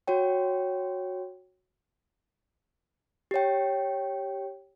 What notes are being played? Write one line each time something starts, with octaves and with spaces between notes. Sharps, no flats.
F#4 C#5 G5
G4 C#5 G5